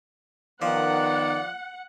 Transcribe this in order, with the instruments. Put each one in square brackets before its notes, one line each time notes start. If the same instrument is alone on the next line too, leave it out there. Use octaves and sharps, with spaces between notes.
[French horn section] D#3 B3 [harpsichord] F3 [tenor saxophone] D5 [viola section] F#5